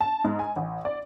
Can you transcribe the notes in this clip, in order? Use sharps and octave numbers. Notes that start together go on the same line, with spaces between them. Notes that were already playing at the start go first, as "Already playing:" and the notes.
A5
G#2
G#5
A1
D5